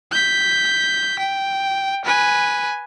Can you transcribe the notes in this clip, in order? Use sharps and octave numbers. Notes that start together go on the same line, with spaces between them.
G6 B6
G5
B4 G#5